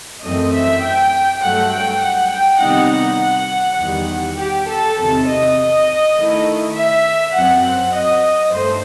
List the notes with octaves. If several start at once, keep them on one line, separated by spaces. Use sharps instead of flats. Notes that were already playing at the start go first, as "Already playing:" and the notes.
F#2 E3 A3 C4 D#5
E5
G5
G2 F#3 A3 F#5
G5
F#5
G5
C3 D#3 G3 B3 D#4 F#5
F#5
E2 D#3 G3
G4
A4
E2 C3 D#3 A4
D#5
D#3 A3 E4
E5
F#2 F#3 C4 F#5
F#5
D#5
G2 D#3 A3 C5